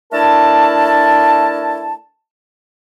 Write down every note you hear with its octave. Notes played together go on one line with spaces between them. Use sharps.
A3 D4 E4 A#4 A5